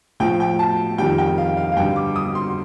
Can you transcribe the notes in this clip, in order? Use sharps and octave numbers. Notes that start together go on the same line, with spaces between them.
A2 F3 G5
G5
A5
F2 D#3 G3 G5
G5
F5
F5
F5
G2 D3 G3 G5
D6
D#6
C6